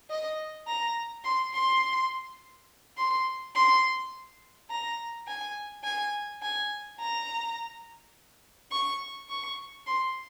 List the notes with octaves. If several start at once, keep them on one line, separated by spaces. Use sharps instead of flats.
D#5
A#5
C6
C6
C6
C6
A#5
G#5
G#5
G#5
A#5
C#6
C#6
C6